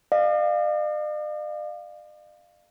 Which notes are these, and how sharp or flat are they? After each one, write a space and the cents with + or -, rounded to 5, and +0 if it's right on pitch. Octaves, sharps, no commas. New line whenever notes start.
D5 +45 F5 +0